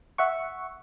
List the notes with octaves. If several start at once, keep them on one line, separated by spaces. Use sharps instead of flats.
E5 F#5 C#6